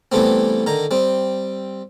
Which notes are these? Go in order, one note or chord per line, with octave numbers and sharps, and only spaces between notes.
E3 G3 A3 B3 C4
D3 D#3 A#5
G3 C4